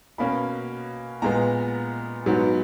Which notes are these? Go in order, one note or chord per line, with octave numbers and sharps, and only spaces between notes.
B2 A#3 C#4 B5
A#2 G#3 B3 A#5
G#2 F#3 B3